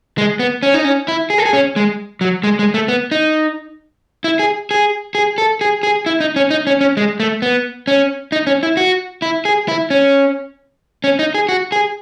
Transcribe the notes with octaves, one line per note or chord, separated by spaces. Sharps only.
G#3
B3
C#4
D#4
C#4
E4
G#4
A4
G#4
C#4
G#3
F#3
G#3
G#3
A3
B3
D#4
E4
G#4
G#4
G#4
A4
G#4
G#4
E4
D#4
C#4
D#4
C#4
C#4
G#3
A3
B3
C#4
D#4
C#4
E4
F#4
E4
G#4
E4
C#4
C#4
D#4
G#4
F#4
G#4